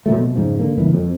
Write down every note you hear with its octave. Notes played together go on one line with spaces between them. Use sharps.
A#2 C#3 F#3 A3
B2
F2 G#2 C#3 F3
D3 A#3
G1 C#2 A#2 E3
F2